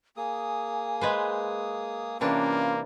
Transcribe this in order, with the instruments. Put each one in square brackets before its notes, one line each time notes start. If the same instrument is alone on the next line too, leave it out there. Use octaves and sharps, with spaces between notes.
[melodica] A#3 G#4 D#6 [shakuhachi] G#5
[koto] G#3 B4 C5
[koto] C3 E3 D4 [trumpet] A#3 [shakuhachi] C#4 [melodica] F4